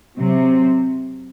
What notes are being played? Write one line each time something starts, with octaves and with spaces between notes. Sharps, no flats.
C3 F#3 C4